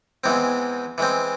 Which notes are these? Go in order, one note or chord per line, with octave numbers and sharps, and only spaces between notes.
E2 E3 G#3 C4
E3 G#3 C4